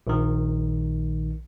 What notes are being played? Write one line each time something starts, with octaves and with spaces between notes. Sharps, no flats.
A#1 D#3